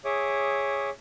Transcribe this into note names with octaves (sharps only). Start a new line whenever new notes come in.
G#4 C#5 E5 D6 D#6